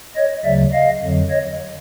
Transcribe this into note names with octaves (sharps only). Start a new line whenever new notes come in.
C#5 D#5
D2 C#3 F#3 D5 E5
D#5 F5
F2 D3 F#3
C#5 D#5